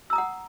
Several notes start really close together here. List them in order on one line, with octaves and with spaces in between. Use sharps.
E6 A#5 D#6 F#5